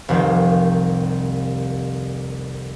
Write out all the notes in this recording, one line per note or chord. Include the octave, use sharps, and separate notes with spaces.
F1 C2 D#3 F3 G5